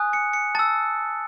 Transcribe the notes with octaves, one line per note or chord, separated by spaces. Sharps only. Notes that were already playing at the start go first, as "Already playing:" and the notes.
Already playing: G#5 D#6 F#6
C#7
C#7
A5 E6 A6